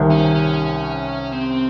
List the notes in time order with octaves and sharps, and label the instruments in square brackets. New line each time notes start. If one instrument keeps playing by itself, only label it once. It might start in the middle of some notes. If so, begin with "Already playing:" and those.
Already playing: [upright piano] C2 C3 D#3
[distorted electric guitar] C#4
C#4
C4